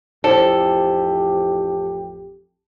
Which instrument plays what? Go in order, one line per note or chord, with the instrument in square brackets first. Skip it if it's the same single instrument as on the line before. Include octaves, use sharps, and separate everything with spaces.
[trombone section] A1 F2 G4 [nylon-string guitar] E4 C5 D5 [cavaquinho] A4